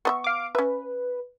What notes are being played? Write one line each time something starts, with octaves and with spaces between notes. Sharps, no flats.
B3 D#5 E5 C#6
F5 D6
C#4 B4 E5